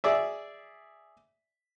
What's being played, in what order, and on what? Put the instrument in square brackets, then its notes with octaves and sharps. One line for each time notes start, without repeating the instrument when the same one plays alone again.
[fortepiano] G#4 D5 E5